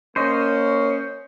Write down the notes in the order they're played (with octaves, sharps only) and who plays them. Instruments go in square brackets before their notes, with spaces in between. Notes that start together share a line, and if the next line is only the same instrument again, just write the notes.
[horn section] A#3 C#4 [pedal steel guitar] C5 D#5